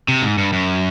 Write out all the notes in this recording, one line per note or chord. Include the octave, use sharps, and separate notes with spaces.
C3
G#2
G2
F#2